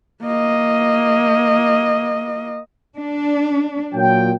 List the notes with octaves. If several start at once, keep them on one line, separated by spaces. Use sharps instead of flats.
A#3 D#5
D4
A#2 F#3 G5